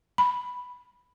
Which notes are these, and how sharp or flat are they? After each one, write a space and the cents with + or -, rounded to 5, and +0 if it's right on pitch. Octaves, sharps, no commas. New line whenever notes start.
B5 +0